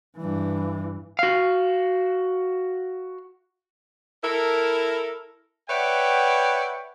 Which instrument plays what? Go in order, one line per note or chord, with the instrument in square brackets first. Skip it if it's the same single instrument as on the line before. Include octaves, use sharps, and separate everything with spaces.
[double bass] G2 E3
[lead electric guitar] F#4 F5
[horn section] E4 A4 A#4
B4 C#5 D5 E5 F#5 G5